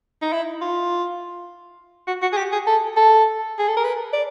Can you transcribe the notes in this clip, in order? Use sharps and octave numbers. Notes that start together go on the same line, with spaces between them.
D#4
E4
F4
F#4
F#4
G#4
G4
G#4
A4
A4
G#4
A4
A#4
B4
D5